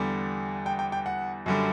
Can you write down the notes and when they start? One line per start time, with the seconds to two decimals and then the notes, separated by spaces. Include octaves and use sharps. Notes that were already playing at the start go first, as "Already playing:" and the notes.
Already playing: E2 D3 G3
0.66 G5
0.79 G5
0.92 G5
1.06 F#5
1.46 F#2 D3 G3